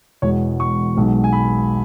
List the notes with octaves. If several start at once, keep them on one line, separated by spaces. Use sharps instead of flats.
E1 E2 B2 G#3 C#5
C#6
B1 B2 G#3
G#5
B5